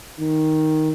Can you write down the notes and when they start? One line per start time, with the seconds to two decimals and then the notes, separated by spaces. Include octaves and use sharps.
0.19 D#3